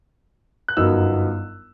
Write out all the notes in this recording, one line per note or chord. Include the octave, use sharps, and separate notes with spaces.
F#6
G1 F#2 F#3 B3 D#4 E6